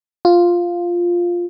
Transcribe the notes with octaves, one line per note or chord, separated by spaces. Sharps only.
F4